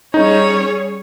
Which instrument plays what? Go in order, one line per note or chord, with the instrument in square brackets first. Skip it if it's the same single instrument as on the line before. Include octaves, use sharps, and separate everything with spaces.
[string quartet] G3 C#4 G#4 C#5 [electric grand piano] D#4